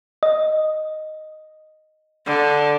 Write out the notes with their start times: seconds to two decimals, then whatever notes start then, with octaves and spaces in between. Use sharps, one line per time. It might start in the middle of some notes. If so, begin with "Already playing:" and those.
0.23 D#5
2.27 D3